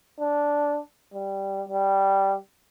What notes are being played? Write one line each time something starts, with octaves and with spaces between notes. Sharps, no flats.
D4
G3
G3